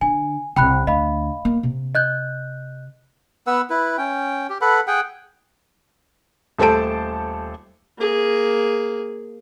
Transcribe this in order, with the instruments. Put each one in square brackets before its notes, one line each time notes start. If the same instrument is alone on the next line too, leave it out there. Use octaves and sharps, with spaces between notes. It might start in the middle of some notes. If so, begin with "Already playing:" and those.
[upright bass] D3 [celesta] G#5
[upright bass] C2 C3 [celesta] G5 B5 F#6
[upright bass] D2 [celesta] D#5 F5 B5
[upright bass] A#3
C3
[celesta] D#5 F#6 G6
[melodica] B3 B4 F#5 E6
E4 B4
C#4 G5
G4
A4 B4 F#5 B5
G#4 F#5 G5
[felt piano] D#1 A3 A4 C5 A5 D7
[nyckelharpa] A#3 G#4